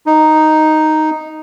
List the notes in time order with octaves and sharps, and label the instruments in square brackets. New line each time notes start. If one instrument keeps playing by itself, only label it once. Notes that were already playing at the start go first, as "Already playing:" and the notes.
[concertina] D#4